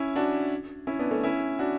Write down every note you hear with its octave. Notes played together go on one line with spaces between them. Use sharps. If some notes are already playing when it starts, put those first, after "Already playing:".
Already playing: C#4 E4
D4 F#4
C#4 E4
B3 D4
A3 C#4
C#4 E4
D4 F#4